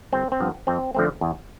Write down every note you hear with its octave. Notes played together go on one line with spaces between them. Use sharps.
G1 C4
C4
G2 F3 B3
F2 C4
D3 F3 A3 C4
E2